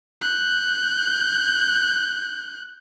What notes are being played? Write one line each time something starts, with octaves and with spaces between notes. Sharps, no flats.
F#6 G6